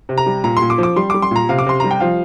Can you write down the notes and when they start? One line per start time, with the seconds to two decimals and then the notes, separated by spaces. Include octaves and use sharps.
0.09 C3
0.18 A#5
0.26 G3
0.44 A#2 A#5
0.57 C6
0.62 A#2
0.70 D6
0.78 F3
0.83 D6
0.96 G3 C6
1.10 G3 D6
1.22 C6
1.31 A#2 A#5
1.49 C3 F5
1.59 D6
1.66 C3 C6
1.80 G3 A#5
1.91 G5
2.00 F3 F5